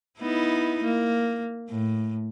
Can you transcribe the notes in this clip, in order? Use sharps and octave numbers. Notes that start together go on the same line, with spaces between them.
B3 D#4 E4
A#3
A2